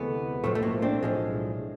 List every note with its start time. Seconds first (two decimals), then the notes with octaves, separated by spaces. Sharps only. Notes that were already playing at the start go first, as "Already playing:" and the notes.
Already playing: D2 C3 E3 G#3 A3 B3
0.44 B1 A2 F3 G#3 A3
0.55 A3
0.63 A#3
0.82 C4 D4
1.03 B1 A2 F3 G#3